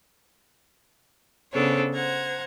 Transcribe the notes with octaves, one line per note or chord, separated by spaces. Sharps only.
C#3 B3 D4 A4 C5 C#5
C5 F#5 A#5 G#6